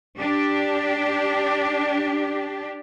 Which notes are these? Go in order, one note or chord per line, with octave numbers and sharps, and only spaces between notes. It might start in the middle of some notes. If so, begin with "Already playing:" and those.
D4 G4